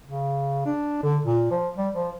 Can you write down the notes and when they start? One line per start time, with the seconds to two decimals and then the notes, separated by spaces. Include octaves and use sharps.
0.07 C#3
0.66 D4
1.03 D3
1.25 A#2
1.51 F3
1.78 G3
1.94 F3